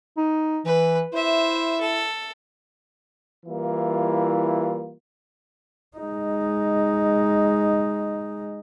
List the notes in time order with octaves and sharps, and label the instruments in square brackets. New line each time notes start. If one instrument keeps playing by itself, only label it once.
[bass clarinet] D#4
[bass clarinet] E3 [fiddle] B4
[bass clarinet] E4 [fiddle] C5 E5
[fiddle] A4
[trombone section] E3 G3 A#3 E4 F4
[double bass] G#3 D#4